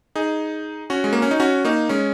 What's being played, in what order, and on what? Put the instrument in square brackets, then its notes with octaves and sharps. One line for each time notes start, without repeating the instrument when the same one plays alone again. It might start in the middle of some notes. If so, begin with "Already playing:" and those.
[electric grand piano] D#4 G#4
C#4 F#4
G#3
A#3
C#4
D#4
C#4 F#4
A#3 D#4
G#3 C#4